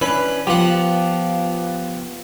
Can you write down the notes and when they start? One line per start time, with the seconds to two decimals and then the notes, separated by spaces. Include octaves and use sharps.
0.01 E3 C#4 D4 B4
0.47 F3 B3 F4 G4 F#5